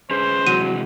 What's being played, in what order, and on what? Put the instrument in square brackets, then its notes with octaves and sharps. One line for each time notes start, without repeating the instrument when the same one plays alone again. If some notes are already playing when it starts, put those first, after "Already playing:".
[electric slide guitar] C#4 G#4 B4 [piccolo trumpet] C5
[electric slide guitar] C3 E3 G#3 [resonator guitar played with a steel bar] F#3 [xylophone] D#7